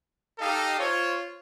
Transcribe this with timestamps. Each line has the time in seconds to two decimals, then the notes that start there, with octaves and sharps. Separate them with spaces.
0.39 D#4 G4 A4 D#5 F5
0.79 F4 C5 C#5